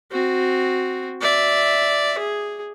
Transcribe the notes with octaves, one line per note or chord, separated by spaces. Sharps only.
C4 F#4
D5 E5
G#4